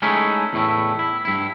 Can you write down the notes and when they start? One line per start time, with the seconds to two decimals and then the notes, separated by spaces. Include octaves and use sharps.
0.02 G#3 A3 C#4 D#4 E4
0.53 E2 A2 A3 E4
0.99 E4
1.25 G2 E4